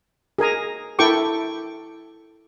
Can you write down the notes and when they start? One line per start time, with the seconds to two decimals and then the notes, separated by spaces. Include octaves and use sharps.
0.38 G#4 A#4 G#5 A#5
0.99 E4 A4 A#4 G5 C#6 D6